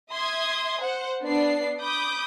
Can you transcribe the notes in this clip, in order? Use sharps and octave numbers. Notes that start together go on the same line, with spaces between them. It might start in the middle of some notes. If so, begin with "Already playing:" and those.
E5 C6 D#6 G#6
C5 F#5
B3 D4 D5 C7
B5 D6 D#6 G6